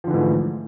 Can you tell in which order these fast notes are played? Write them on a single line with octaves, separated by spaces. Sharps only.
F3 D3 E3 G#2 A3